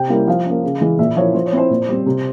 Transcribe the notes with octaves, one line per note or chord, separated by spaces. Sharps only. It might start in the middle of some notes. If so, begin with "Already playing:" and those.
Already playing: C3 G5
G3 A#3 C#4 E4
F3 F5
A#3 C#4
C#3
E3 G#3
A#2 E5
F3 A#3 E4 C#5
F3 C5
C#5
C4 E4 C5
A#2
G3 C4
C3